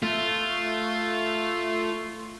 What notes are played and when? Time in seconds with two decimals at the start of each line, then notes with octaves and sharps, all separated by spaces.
0.03 A3 F4